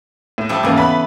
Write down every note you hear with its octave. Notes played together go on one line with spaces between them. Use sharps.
A2
F3 G3 A3
G#1 C#3 E3 A#3
B3 B4 B5